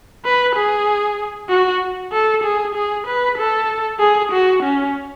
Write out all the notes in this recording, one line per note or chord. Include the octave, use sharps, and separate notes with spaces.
B4
G#4
F#4
A4
G#4
G#4
B4
A4
G#4
F#4
C#4